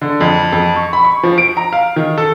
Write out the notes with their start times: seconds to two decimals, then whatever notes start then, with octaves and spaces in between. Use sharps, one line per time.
0.02 D3
0.21 F2
0.52 F2
0.76 C#6
0.93 B5
1.04 C#6
1.23 F3
1.38 D7
1.57 A#5
1.73 F5
1.96 D#3
2.18 A4